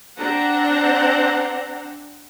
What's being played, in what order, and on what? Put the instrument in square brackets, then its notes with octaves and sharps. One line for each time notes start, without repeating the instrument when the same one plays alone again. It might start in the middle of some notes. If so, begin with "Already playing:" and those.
[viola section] C4 D4 F#5 A#5